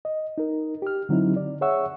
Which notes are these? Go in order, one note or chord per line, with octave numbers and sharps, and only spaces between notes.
D#5
D#4 A#4
G4 F6
D3 F#3 C4 D#4 E4
D5
G#4 C#5 E5 F#5 C#6 E6